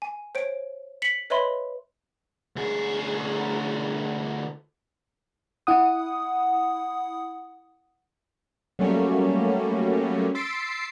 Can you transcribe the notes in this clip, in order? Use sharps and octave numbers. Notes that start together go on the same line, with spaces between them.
G#5
C5 C#5 D7
B6 C#7 F#7
B4 C#5 D#5 E5 B5 C6
D2 G#4
E4 F#5 D#6
F#3 G3 A3 A#3 C#4
C6 E6 A6 B6 C7 D7